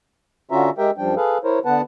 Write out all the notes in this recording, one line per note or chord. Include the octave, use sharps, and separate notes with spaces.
D3 C#4 F4 F#4 E5 A#5
G#3 G4 A#4 E5 G5
F#2 F3 G3 D4 G5
G#4 A4 B4 F5
E4 A#4 C5 C#5
D3 B3 B4 F#5 A5